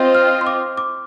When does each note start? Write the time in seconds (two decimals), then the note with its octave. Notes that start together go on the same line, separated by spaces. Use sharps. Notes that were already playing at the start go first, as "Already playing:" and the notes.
Already playing: C4 F4 C5 D#5 G6
0.15 F6
0.41 C6
0.47 D6
0.77 D6